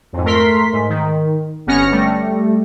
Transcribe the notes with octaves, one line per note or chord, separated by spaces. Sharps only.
F2 G#2
A3 A#4 C6 B6
G#2
D#3
G1 B3 C#4 F6 A#6 C#7
G3 A3